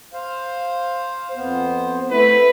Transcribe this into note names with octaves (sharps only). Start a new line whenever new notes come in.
C5 F5
F2 B3 C5
A3 E4 B4